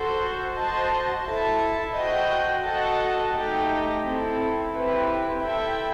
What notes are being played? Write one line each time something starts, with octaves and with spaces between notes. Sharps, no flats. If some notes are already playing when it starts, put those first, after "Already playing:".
Already playing: F#4 A4 C5
F#4 C5 D#5 A5
E4 A4 E5 A5
F#4 C5 D#5 G5
F#4 A4 D#5 F#5 A5
A3 D#4 G4 D#5 G5
C4 E4 A4
C4 E4 G4 B4
E4 A4 E5 G5